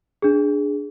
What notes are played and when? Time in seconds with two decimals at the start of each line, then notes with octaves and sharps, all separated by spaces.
0.22 D4 G#4